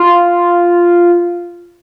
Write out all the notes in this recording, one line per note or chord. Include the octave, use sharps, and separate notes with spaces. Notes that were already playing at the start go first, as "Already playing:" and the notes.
Already playing: F4